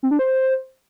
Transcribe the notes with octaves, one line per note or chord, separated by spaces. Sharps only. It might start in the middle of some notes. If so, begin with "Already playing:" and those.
C4
D4
C5